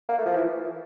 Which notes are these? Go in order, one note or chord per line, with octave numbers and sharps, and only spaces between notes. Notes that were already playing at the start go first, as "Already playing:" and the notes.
A#3
A3
F3
E3